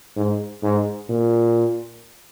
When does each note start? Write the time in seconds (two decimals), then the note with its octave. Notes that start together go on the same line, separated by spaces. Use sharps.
0.16 G#2
0.63 G#2
1.09 A#2